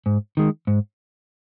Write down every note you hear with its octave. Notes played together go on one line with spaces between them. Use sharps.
G#2
D#3 G#3
G#2